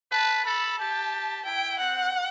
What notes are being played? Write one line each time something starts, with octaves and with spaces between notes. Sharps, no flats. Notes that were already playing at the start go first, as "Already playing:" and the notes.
B4 A5
A4 B5
G4 A5
E4 G5
C4 F#5